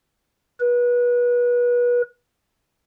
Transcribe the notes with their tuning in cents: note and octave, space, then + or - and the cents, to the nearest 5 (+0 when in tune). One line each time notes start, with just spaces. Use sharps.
B4 -30